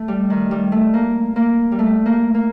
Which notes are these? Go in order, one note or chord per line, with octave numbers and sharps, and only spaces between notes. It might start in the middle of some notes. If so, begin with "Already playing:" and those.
Already playing: A3
G3
D#3
G3
A3
A#3
A#3
G3
A3
A#3
A#3